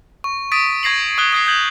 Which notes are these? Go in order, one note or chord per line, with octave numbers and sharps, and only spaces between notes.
C#6
D#6 A6 B6 D7 D#7
C#6 G#6 A#6 C7 F#7
D#6 F#6 G7
D#6 G#6 C7
D#6 G6 G#6 F#7